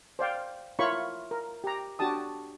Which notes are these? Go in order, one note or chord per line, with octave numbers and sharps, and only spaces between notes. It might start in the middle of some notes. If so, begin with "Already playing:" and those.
C5 D5 F5 G5
E4 F4 A#4 C#5 B5 C#6
A#4
G4 A#5
D4 F#4 G4 A5 D#6